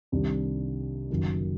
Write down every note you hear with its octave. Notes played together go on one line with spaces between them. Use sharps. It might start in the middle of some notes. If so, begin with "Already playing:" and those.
C2 C3 D#3 G3 D4
F#1 F#2 D#3